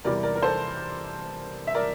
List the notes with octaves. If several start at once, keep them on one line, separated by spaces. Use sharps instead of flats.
E2 C3 E3 G3 A#4 D5
A#4 D5
A#4
A4 C5
E5
A#4 D5